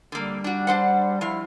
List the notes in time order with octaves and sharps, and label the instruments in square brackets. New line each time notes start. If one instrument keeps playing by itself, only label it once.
[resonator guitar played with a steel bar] D3 A#3 [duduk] G3
[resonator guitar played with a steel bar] D4 F#4
D4 C5 F#5
[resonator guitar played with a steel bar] F3 F5 [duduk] E4